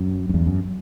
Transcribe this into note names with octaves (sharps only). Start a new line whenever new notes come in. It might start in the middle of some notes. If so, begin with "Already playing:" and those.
Already playing: F#2
F#2
E2 G2
F#2